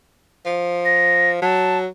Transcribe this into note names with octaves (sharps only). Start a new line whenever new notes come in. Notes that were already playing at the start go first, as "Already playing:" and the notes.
F3
A#6
F#3 A5